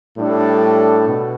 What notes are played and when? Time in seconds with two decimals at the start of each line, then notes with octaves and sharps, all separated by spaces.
0.16 A2 G3 D4 A4
1.07 B2